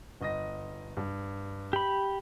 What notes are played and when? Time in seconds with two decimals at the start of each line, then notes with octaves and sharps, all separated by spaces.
0.21 G1 D#5 A#6
0.97 G2
1.73 G4 B5